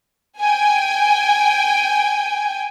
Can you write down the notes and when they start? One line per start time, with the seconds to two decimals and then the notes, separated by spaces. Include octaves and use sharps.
0.39 G5 G#5